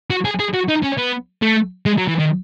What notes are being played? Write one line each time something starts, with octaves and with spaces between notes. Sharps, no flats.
F#4
G#4
G#4
F#4
D#4
C#4
B3
A3
G#3
F#3
E3
D#3